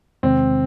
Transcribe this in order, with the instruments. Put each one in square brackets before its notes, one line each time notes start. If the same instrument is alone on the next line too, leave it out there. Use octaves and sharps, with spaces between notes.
[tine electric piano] E2 C3 D#3 G#3 [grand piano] C4